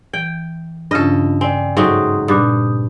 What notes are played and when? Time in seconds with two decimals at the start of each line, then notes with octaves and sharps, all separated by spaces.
0.13 E3 G5
0.91 G2 C#3 C#4 D4 F4 A4 D#5
1.41 C4 D5 G5 G#5
1.77 G#2 F#3 C4 A4 E5 C6 C#6 D#6
2.28 G2 A#2 D#6 F#6 G6 A6